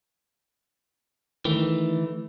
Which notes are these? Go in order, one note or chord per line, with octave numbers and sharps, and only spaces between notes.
D#3 E3 A3